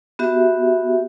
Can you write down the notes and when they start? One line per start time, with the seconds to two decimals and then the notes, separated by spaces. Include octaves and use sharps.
0.19 B3 F#4 G4 E5